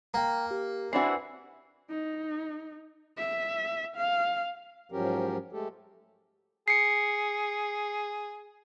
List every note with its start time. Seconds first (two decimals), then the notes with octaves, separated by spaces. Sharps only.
0.14 A#3 G5 A#5
0.51 G4
0.93 E3 C4 D4 F#4 C7
1.90 D#4
3.17 E5
3.96 F5
4.92 G#2 F3 F#3 C#4 G4 A#4
5.52 G#3 A3 G4 A4
6.68 G#4 C7 C#7